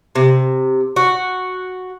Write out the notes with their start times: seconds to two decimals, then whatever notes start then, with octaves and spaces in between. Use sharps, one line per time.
0.15 C3
0.96 F#4